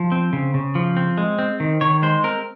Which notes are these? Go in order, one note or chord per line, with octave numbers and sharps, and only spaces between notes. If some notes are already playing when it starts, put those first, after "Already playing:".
Already playing: F3
C4
C#3
C#3
F3
C4
G#3
C4
D#3
D#3 C#5
G#3 C5
C4 A#4